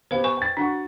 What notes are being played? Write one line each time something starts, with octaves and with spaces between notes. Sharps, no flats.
B3 G4 C5 F5
B4 G#5 C#6
G5 A6
D4 F#4 F#5 C#6